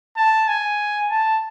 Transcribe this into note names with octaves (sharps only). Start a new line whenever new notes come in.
A5
G#5
A5